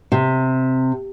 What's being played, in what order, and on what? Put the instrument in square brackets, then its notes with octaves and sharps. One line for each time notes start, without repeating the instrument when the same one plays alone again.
[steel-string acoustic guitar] C3